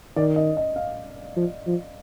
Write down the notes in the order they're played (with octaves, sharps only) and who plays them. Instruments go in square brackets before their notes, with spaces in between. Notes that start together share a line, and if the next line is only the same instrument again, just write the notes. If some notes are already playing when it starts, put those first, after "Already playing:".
[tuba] D#3 [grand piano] D5
[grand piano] D#5
D#5
F5
[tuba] F3
F3